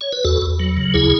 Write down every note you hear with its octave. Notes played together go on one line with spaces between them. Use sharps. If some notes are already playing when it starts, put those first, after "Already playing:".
C#5
B4
E2 F#4 A4
E2
F#3
C#3
D2 E4 G#4